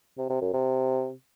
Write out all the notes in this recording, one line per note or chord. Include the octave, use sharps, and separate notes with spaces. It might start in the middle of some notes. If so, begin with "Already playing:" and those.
C3
C3
F#2
C3